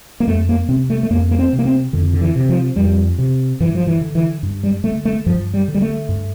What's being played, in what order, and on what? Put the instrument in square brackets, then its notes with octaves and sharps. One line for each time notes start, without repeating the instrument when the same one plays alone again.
[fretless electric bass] A#3
F2 A3
A#3
C3 C4
A3
A3
F2 A#3
A#3
C4
C3
A#3
C4
F2 D3
D3
E3
C3
F3
F2 G3
C3
G2 E3
F3
E3
D3
E3
G2
G3
D3 A3
A3
G2 F3
G3
D3
G3
A3
G2